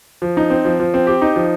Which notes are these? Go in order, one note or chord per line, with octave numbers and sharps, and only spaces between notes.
F3
D#4
C4
F3
F3
C4
G4
D#4
F3